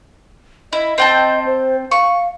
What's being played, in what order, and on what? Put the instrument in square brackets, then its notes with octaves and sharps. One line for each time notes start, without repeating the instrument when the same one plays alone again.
[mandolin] E4 [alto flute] D#5
[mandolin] C4 G5 A5
[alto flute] C5
[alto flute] F5 [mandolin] C#6